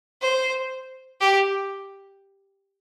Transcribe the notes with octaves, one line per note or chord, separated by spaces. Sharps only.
C5
G4